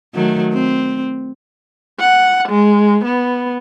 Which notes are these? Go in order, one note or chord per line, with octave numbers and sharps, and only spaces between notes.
D#3 F#3 A3
C4
F#5
G#3
B3